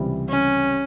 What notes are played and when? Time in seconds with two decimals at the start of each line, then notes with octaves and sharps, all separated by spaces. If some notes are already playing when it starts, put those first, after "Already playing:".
Already playing: C#2 C3 E3 G3
0.29 C#4